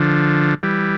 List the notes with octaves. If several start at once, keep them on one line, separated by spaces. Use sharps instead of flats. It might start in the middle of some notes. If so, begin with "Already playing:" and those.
Already playing: D3 F3
E3 G3